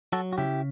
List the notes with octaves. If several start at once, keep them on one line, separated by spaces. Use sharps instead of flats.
F#3 F#4 A4
F#4
C#3 E4 G4